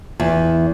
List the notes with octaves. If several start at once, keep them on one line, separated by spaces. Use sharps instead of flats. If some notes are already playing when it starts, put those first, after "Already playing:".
E2